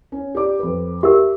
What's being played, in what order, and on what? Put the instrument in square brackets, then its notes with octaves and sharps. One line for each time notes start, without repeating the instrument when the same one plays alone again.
[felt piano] C#4
G4 D5 D6
F2 B4
[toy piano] G4 A#4 [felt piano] E5